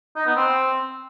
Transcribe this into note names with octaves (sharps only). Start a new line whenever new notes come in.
D#4
B3
C4